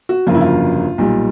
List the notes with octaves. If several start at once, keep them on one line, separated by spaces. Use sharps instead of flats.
F#4
G1 F2 C#3 F#3 A#3 F4
E4
F4
B1 A#2 G3